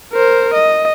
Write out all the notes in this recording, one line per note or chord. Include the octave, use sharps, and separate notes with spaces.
A#4 C5
D#5